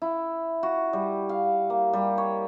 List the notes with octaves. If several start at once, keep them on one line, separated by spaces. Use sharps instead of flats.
E4
F#4
G3
F5
A#3
G3
C#5